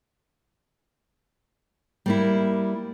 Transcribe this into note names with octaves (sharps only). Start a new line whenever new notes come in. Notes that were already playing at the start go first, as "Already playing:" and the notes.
G3 A#3 E4